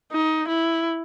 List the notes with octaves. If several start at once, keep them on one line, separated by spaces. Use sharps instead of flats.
D#4
E4